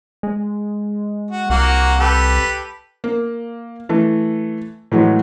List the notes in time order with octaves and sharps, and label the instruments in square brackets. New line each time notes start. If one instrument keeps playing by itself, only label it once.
[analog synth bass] G#3
[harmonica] F#4
[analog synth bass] C2 [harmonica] A#3 F#4
[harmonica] G4 A4 B4
[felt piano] A#3
E3 A3
A2 E3 F#3 G#3